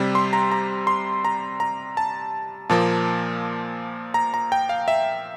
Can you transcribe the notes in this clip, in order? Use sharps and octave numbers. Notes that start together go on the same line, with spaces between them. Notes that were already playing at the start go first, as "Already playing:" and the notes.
Already playing: C3 G3 C4
C6
A#5
A#5
C6
A#5
A#5
A5
A#2 F3 A#3 A5
A#5
A#5
G5
F5
E5